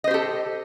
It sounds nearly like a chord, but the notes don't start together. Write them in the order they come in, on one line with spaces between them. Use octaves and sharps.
D#5 C5 G4 A4